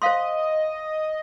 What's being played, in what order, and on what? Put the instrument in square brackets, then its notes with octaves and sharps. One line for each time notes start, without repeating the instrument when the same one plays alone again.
[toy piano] C5 F5 C6 [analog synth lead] D#5